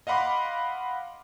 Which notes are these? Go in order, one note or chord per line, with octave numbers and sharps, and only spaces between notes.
D#5 F5 F#5 B5 C6 D6